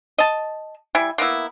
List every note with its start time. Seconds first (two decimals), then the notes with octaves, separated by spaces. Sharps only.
0.18 D#5 A5
0.95 G3 E4 G#5
1.18 A#3 B3 E4